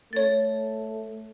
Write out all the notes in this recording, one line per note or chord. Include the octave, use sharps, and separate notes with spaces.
A3 C#5 A6